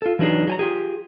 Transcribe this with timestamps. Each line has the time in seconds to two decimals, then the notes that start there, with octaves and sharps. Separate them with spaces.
0.02 F4 A4
0.19 E3 F#3 D4 D#4 G#4
0.47 F#3 G#5 A#5
0.59 F4 G4 G#4